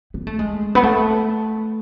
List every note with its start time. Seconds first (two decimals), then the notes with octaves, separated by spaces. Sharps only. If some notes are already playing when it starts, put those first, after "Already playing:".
0.14 B3
0.27 A3
0.39 G#3
0.75 B3
0.83 A3